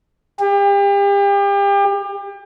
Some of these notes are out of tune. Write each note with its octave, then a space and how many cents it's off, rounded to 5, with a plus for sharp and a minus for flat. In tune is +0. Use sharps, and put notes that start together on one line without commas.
G4 +35